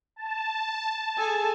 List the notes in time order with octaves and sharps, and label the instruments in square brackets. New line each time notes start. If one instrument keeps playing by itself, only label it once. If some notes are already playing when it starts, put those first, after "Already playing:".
[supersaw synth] A5
[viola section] G#4 A4 G#5